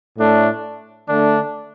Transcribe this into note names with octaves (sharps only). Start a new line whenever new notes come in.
A2 A3 D4
D3 A3 D4